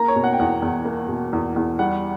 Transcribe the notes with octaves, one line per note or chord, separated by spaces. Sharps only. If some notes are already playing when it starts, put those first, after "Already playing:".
Already playing: A#3 A#5
C#5
B2
F#5
G5
E2 F#5
E2
A#3
B2
E2
E2
G3 F#5